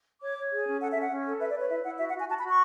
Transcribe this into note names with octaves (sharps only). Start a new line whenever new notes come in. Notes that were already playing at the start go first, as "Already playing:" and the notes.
C#5 D6
C#5
G#4
C#4
A4 F#5
E5
C#4
F#5
C#4
A4
B4 E5
D5
B4 C#5
E4 E5
E4 F#5
F#4 E5
F#5
F#4 G#5
F#4 A5
B5
F#4 C#6